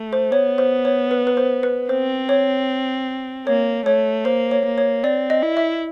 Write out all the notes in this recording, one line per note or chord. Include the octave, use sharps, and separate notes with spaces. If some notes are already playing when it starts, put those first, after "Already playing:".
Already playing: A3
C5
B3 C#5
C5
C#5
B4
B4
C5
B4
C4 C5
C#5
A#3 C#5
A3 C#5
A#3 C5
C#5
A#3
C#5
C4 D5
D#5
E4
E5